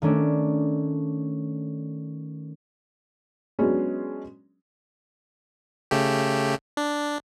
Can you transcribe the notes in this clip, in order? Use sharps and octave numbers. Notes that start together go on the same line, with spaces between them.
D#3 A3 C#4 D4
F#3 G#3 B3 C#4 D4
C#3 A3 G4
D4